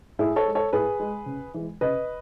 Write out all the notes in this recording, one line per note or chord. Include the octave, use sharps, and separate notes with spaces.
A2 E4 G#4
A4 C#5
G#3
A4 C#5
A2 G#4 B4
G#3
C#3
E3 G#3
C#3 B4 D#5